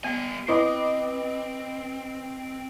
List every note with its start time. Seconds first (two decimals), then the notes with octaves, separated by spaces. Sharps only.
0.04 G3 B3 G#5
0.48 C4 E4 B4 D#5 D6